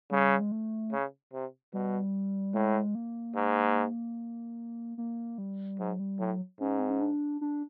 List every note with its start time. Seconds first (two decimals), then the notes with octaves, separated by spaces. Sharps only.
0.11 C#3 G3
0.40 G#3
0.52 A3
0.92 C#3
1.33 C3
1.73 B2 G3
2.54 A2 G#3
2.95 A#3
3.35 G#2
4.98 A#3
5.38 G3
5.79 G#2 F#3
5.99 G3
6.19 A2 F#3
6.60 G#2 C#4
6.79 C4
6.90 C#4
7.01 D4
7.41 D4